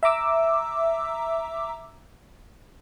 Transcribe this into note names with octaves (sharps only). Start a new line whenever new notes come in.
E5 A#5 D6 E6